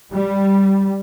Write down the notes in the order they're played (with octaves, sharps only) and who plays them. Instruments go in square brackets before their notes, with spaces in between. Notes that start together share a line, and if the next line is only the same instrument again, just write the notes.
[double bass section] G3